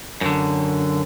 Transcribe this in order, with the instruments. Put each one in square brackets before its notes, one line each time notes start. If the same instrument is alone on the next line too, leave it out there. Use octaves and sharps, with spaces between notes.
[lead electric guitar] F#2 D3